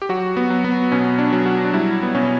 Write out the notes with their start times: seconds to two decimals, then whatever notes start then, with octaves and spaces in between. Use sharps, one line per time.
0.02 G4
0.09 F#3 F#4
0.37 B3
0.50 F#3
0.64 B3
0.91 B2 C#4
1.18 D4
1.33 F#3
1.46 F#4
1.65 D4
1.73 G3 E4
2.03 B3
2.15 B2 C#4